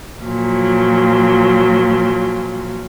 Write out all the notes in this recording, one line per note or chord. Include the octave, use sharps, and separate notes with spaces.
A#2 F3 F#3